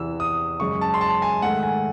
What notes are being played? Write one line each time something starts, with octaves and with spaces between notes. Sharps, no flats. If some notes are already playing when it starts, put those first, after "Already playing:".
Already playing: E2 C3 E3 E6
D#6
F#2 C#3 G#3 C#6
A5
C6
A5
G#5
G#2 D#3 A3 F#5
G#5